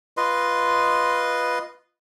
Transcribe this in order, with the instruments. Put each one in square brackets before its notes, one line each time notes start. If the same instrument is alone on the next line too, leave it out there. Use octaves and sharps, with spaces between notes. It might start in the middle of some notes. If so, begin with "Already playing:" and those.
[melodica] F4 B4 D#5 C6